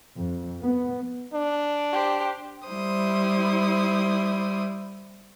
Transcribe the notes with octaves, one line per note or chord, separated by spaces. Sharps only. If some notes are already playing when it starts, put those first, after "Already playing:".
F2
B3
D4
G4 C5
G3 E4 C5 D#6